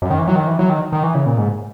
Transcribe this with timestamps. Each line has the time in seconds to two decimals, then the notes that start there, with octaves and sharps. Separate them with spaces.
0.02 F#2
0.10 D#3
0.18 E3
0.27 F#3
0.36 D#3
0.47 E3
0.59 F#3
0.70 D#3
0.92 D#3
1.03 E3
1.15 C#3
1.26 A#2
1.38 G#2